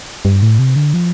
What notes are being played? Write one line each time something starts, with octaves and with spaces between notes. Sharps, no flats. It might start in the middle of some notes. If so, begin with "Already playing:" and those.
G2
A2
C3
D3
F3